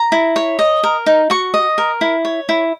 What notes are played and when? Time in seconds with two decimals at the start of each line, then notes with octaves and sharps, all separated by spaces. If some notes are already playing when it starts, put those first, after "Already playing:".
Already playing: A#5
0.12 E4
0.36 C#5
0.59 D#5
0.83 A#4
1.06 D#4
1.30 F#4 C#6
1.54 D#5
1.78 A#4
2.01 E4
2.25 C#5
2.49 E4